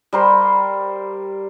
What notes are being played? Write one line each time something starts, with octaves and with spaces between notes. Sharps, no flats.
G3 A#4 C5